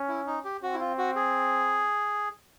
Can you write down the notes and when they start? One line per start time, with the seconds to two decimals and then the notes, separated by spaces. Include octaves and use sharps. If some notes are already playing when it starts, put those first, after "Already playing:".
Already playing: C#4
0.09 E4
0.26 D#4
0.44 G4
0.62 C4 F#4
0.74 E4
0.80 F4
0.98 F#4
1.16 G#4